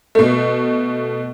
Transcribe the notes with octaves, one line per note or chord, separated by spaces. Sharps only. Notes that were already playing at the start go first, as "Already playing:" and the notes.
B2 A3